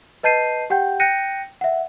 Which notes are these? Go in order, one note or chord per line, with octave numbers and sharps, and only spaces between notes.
B4 D#5 A5 G6 C7 D#7
G4 F#5 G5 G6
G5 F#6 G6 A#6 C#7 D#7
E5 F#5